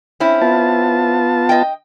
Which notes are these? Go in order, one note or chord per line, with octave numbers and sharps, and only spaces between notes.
C4 C#4 E4
B3 F4 A5
D#5 G5